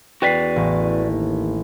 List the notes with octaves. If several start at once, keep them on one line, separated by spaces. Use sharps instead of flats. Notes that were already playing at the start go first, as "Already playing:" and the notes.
E2 F#4 B4 D5 G5 B6 C7
A1
D#2